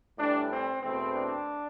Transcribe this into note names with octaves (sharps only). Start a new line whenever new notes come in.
A2 E3 G3 D4
C4
E2 B2 A3 C4
D4